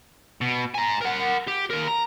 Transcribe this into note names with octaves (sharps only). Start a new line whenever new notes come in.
B2
G#5 A#5
A#4 F#5
G4
D#2 A#4
A#5